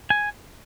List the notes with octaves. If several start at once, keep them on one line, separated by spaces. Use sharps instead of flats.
G#5